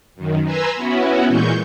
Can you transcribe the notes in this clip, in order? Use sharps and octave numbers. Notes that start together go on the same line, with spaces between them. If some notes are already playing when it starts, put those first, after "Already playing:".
F#2 D#3
B4 G#5 A#5 C6 E6
B3 C#4 E4 F#4
A#2 E3 G#3 C#6 G6